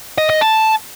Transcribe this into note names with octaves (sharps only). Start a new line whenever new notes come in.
D#5
D#5
A5